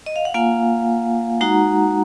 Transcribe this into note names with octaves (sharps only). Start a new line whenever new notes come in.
D#5
F5
F#5
A#3 F4 F5 G#5
G#3 D#4 F#4 F#5 A#5